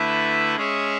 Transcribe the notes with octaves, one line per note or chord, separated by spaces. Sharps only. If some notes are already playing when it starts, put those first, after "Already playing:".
Already playing: D3 A3 E4 B4 E5
G#3 C#4 G#4 C#5 E5